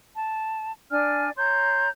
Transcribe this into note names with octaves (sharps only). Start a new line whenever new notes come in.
A5
D4 D5 G#5 F6
C#5 A#5 C6 G6